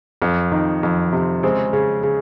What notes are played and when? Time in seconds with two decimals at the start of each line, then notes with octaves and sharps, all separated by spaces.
0.22 F2
0.52 D#3
0.83 F2
1.13 C3
1.43 C#3 G#3 C4
1.73 C#3
2.03 C#3